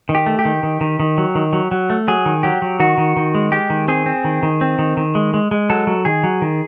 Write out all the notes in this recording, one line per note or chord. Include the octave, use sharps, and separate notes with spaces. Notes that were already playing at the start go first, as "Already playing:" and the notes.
D#3
G4
A3
G4
D#3
D#3
D#3
D#3
F#3
D#3
F#3
F#3
A3
F#3 G#4
D#3
F#3 G4
F#3
D#3 F#4
D#3
D#3
G#3
G#3 G4
D#3
C4 G#4
C4
D#3
D#3
C4
D#3
D#3
G#3
G#3
G#3
F#3 A4
F#3
D#3 G#4
F#3
D#3